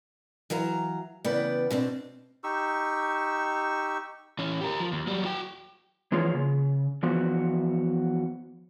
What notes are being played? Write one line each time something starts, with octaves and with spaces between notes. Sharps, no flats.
E3 F#3 F5 A#5
E2 C#3 B3 B4 D5 G5
B2 C4 D4
D#4 G4 C#6 E6
E3 C#4
G4 A#4
F3
D#2
F#3 G3
F#4 G5
E3 F3 A#3 F4 G#4 C#5
C#3
E3 F3 B3 F#4